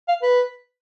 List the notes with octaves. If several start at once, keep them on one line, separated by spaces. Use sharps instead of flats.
F5
B4